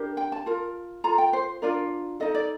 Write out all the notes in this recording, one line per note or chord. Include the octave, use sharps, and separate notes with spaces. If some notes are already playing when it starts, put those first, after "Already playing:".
Already playing: D4 G4 A#4
G5
A5
F4 A#4
F4 A4 A#5
G5
C5
D4 F4 A#4 D5
D#4 A4 D#5
D5